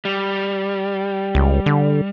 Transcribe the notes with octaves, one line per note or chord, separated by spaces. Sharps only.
G3
C#2
D3